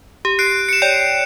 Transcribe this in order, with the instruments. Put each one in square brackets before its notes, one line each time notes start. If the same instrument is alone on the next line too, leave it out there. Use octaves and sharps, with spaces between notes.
[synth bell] G4
[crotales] F#6 C7 D7
C#7 E7
[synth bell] C#5 D5 G5